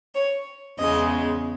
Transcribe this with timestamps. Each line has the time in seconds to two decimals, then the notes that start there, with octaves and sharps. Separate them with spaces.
0.15 C#5
0.79 E2 C#3 G#3 D#5